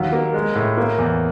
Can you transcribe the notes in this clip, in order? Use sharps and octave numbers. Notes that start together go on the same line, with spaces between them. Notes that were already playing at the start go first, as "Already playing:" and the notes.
Already playing: D#2 F#3
A#3
G#3
A2
A#3
E2